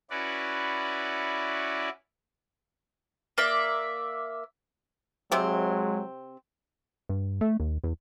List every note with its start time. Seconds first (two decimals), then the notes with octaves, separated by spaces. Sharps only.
0.10 C#4 E4 F#4 B4 D5
3.38 A#3 D5 E5
5.32 C3 F#3 G#3 C4
7.09 G2
7.41 A3
7.60 D#2
7.84 E2